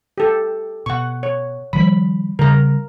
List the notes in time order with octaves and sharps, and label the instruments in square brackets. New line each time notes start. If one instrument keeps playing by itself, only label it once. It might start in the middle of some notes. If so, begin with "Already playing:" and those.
[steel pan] G4 A4
[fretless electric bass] B2 [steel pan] F#5 C#6
[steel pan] C#5
[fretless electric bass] D#3 F3 G3 [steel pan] B5
[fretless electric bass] C#3 G3 [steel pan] A#4 A#5